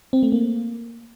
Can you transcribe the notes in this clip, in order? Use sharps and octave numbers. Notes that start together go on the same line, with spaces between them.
C4
A3
A#3